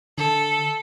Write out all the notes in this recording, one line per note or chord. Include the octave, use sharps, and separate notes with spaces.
D3 A4